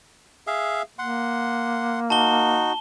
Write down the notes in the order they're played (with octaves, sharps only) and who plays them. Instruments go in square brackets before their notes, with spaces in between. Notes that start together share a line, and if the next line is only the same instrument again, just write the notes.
[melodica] G#4 E5 F5
[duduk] A#3 [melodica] F#5 C6
[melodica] D#4 F#4 [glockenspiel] A5 G7